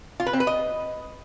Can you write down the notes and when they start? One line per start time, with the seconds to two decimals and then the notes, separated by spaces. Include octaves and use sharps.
0.20 F4
0.26 B4
0.33 C4
0.40 B4
0.47 D#5